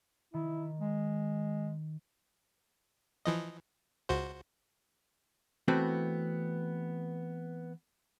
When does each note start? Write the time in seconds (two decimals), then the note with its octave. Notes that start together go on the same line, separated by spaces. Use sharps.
0.34 D#3 E4
0.81 G#3
3.25 E3 F3 D#5
4.09 C#2 F#4 C5
5.68 E3 A3 B3 C4 F#4